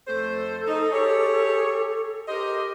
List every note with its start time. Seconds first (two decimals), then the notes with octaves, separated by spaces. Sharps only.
0.08 F2 A3 A4 C5
0.68 D#4
0.92 G4 G#4 C#5
2.27 G4 A#4 C5 D#5